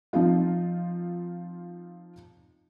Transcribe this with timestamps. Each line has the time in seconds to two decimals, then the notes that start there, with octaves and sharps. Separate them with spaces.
0.13 F3 C4 D#4 F4